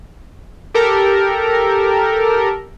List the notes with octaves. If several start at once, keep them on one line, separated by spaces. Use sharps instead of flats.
G4 A4 A#4